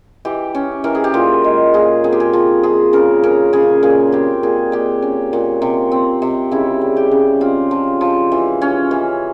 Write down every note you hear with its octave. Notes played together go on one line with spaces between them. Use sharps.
E3 G4
C#4
E3 A#4
G#4
G4
A#2 F4
G#3
A#2 G#4
C4 G#4
G4
G#4
F3
F3 G#4
C#3 A#4
C#4 A#4
C#3 G#4
A#2 G#4
C4 G4
A#2 G#4
A#2 G4
C#4
A#2
C3
C4
C3
C#3 E4
G3
G4
C#3
C4 F4
F3
F3
E3
C#4
E3